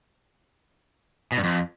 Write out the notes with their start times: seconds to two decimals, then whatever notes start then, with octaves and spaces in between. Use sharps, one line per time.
1.32 B2
1.38 G2
1.44 F2